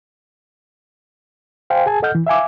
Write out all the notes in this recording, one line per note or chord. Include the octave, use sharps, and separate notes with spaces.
C5 F5 G5 G#5
G#4 G#5 A5
A4 D#5 F#5 F6 G6
E3
E5 F5 G#5 D6